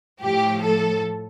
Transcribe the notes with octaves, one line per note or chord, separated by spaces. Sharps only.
A2 F3 G4
A4